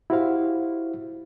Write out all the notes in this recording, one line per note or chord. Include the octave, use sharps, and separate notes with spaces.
E4 F#4 G4 C5 F5